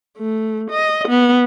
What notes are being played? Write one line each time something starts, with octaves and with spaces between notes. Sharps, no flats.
A3
D#5
B3